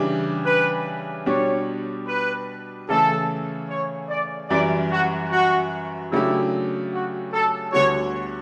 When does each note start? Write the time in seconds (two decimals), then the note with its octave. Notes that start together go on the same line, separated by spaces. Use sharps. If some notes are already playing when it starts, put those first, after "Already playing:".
Already playing: C#3 E3 G3 D4 G4
0.46 B4
1.26 B2 G3 D4 G4 C#5
2.07 B4
2.89 C#3 E3 A3 A4
3.69 C#5
4.09 D5
4.49 F#2 E3 G3 D5
4.91 F#4
5.30 F#4
6.11 C#3 F#3 A3 D4 E4 G4
6.93 F#4
7.33 A4
7.73 D2 D3 G3 B3 F#4 C#5